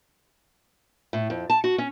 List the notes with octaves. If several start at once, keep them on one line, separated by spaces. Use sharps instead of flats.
A2
F2
A5
F#4
C#4